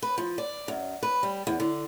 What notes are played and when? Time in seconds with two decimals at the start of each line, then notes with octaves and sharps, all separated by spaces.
0.02 B4
0.18 F3
0.38 D5
0.68 F#2
1.03 B4
1.23 G3
1.47 E2
1.60 D3